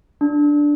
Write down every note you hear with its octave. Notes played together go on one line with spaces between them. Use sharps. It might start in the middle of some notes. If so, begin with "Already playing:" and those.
D4